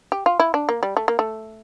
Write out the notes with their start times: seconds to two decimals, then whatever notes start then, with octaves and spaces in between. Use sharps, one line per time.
0.12 G4
0.26 F4
0.40 E4
0.54 D4
0.69 A#3
0.83 G3
0.97 A3
1.08 A#3
1.19 A3